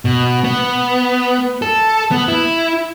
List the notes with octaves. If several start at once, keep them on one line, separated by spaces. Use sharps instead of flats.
B2
B3
A4
B3
E4